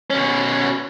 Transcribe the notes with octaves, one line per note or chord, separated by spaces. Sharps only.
B2 C#4